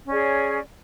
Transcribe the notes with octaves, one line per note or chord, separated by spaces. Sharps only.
C#4 G#4 C#5 D5